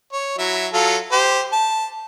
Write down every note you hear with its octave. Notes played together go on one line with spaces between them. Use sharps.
C#5
F#3 E4 E5
F#3 F4 A4
G4 C5
A5